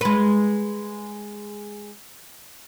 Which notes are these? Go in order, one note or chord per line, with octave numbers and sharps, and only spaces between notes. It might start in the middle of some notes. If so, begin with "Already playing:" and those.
G#3 B4